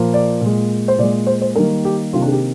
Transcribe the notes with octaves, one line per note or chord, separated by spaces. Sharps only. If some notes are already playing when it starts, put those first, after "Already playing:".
Already playing: A#2 F3 A#3
D5
A#2 G#3
C5
A#2 G#3 D5
C5
C5
D#3 G3 A#3 A#4
G4
C3 D#3 A#3 F4
D4
G#4
G4